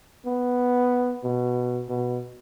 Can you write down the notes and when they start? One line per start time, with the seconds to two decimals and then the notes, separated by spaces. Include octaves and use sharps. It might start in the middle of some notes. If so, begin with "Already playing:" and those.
0.26 B3
1.24 B2
1.89 B2